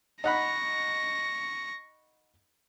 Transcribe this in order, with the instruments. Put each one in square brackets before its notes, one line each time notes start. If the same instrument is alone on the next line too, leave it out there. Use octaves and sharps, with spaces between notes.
[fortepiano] D#4 F#5 B5 [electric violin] C#6 A#6